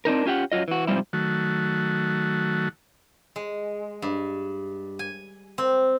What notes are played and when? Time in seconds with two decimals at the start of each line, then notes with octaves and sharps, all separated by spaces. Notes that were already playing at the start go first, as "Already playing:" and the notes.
0.05 C4 D4 D#4 A#4
0.26 C#4 F4 G4 E5 F#5
0.52 F#2 F#3 F4 D#5
0.68 E3 F#4
0.87 G#2 C3 F3 G3 E4
1.13 D#3 F#3 A3 F#4
3.36 G#3
4.02 G2
4.99 G#5
5.58 C4